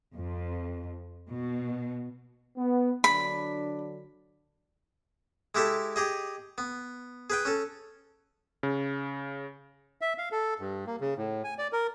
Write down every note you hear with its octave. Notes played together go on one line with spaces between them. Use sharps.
F2
B2
B3
D3 F#3 D4 B5
G#3 E4 G4 A4 E5
G4 G#4 D#5
B3
G#4 B4 G5
C#4 A4
C#3
E5
F5
A4
G2
A#3
C#3
A2
G#5
D5
A#4